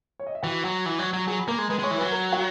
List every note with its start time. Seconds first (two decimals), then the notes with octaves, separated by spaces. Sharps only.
0.20 C#5
0.27 D#5
0.35 E5
0.43 E3 F#4 F#5
0.65 F#3
0.86 E3
0.99 F#3
1.13 F#3
1.27 F#3 G#4 G#5
1.39 B5
1.48 A#3 A#4 A#5
1.58 G#3
1.69 G#3 B4 B5
1.79 G#3 C#5 C#6
1.91 E3
1.97 F#3 B4 B5
2.12 A#4 A#5
2.32 F#4 F#5